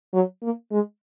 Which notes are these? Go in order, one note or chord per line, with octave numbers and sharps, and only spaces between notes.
F#3
A#3
G#3